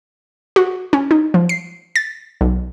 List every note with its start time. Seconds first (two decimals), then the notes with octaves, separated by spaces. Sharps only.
0.56 F#4
0.93 C#4
1.11 D#4
1.34 F3
1.49 C7
1.96 A6
2.41 B1